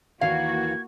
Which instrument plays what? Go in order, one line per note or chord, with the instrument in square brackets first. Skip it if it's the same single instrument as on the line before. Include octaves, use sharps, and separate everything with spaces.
[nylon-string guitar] D#2 D#3 E3 [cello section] A#3 F#4 [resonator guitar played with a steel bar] F5 [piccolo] G#6